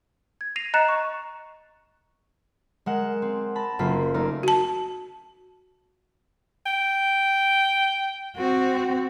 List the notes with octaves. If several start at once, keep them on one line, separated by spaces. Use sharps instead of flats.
G#6
A#6 C7 D#7 F7
D#5 A#5 F#6 A6 C#7 E7
C#6
G#3 A#4 F#5 E7
C4
A5 B5 A#6
F#1 A#3 F4 A4 B6
A3 A#3 D#4 A4 A#4 D5
F#4 A5
G5
C4 F#4